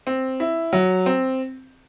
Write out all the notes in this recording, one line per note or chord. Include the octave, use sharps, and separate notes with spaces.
C4
E4
F#3
C4